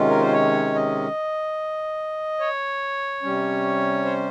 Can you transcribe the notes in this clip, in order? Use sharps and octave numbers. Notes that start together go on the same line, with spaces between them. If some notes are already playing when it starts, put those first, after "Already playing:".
Already playing: C3 D#3 G#3 C#4 F4
A#4
C5
C#5
D#5
C#5
C3 G3 C#4
C5